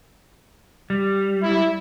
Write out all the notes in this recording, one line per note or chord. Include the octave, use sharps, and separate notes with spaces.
G3
E4